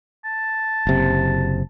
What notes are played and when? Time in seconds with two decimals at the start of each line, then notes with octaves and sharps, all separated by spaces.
0.24 A5
0.87 F#1 C3